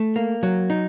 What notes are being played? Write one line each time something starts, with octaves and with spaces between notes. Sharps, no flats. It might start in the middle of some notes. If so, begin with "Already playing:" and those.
Already playing: A3
A#3
F#3
D#4